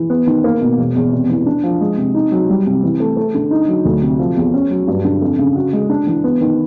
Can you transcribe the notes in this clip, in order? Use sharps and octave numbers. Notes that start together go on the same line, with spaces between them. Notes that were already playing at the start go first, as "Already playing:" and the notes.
Already playing: E3
B3
D#3
A#3
B2
E1
E2
C3
E3
D4
F3
G#3
C3
D#4
F#3
G3
C3
E3
A3
A3
D3
D#4
F#3
D2
C3
F3
E2
C#4
F#3
G2
D3
F2
C#3
F#4
G#3
D4
E3
B3
D#3